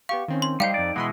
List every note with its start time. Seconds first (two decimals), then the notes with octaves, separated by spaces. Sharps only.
0.09 B3 G4 F5 C#6
0.28 D#3 C4 C#4
0.42 C6
0.60 G3 D#4 C5 F5 G5
0.74 F2 D5
0.96 B2 E3 G#3 F#5 B5 C6